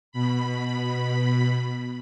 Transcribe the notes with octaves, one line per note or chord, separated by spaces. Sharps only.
B2 B5